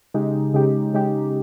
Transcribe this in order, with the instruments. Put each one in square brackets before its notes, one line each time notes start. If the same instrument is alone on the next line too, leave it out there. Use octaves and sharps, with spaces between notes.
[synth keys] C#3 G#3 D#4 G4
C#3 G#3 D#4 G4
C#3 G#3 D#4 G4